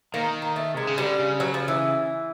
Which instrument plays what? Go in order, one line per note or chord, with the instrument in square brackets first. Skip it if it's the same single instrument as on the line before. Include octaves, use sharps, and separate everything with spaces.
[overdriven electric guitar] D#3 [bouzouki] A#3
[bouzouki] A#3
A3
[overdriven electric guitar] C3 [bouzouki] G#3
[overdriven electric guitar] C#3
[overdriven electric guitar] D3 [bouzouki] G3
[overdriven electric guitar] C#3
[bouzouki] F#3
F3
E3